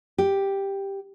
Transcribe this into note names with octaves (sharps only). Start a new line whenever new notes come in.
G4